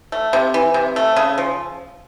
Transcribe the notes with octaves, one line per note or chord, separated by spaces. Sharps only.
A3
C3
E3
C3
A3
C#3
F3